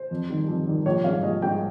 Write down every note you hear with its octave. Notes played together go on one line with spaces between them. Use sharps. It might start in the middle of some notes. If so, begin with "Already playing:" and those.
Already playing: C5
F2
D#3 G3
F2
D#3 G3
A#1 C#5
G#2 G3 F5
A#1 D#5
G#2 G3 G5